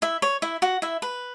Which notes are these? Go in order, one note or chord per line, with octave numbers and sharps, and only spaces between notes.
E4 E5
C#5
E4 E5
F#4 F#5
E4 E5
B4